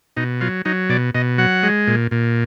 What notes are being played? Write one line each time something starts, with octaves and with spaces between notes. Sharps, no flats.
B2 D#4
F#3 F4
F#3 D#4
B2 D5
B2 D#5
F#3 F#5
G#3
A#2
A#2